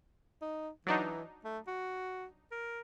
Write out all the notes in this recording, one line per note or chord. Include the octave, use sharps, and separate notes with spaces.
D#4
E3 F#3 D4 D#4
A3
F#4
A#4